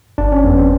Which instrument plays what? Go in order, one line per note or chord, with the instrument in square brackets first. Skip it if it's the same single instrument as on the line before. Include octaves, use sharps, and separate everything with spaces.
[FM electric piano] G1 [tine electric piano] D4
[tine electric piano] C#4
[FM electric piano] F2 [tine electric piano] B3
[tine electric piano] C4